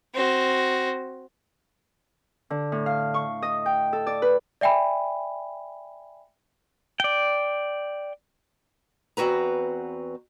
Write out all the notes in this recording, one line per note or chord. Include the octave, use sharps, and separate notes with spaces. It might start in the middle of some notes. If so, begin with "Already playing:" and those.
C4 F#4
D3
A2
F5
C#6
D#5
G5
A4
D5
B4
D5 E5 G5 G#5 B5
D5 G5
E2 C4 F#4 B4 A#5